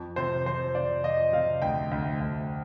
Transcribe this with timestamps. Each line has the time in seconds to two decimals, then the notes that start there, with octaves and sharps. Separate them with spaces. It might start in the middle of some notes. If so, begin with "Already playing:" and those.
Already playing: F2
0.16 C3 C5
0.46 F2 C5
0.75 C3 D5
1.03 F2 D#5
1.32 C3 F5
1.62 D2 G5
1.91 D2
2.20 D2